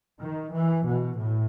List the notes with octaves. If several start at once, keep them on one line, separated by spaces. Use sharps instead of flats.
D#3
E3
B2
A2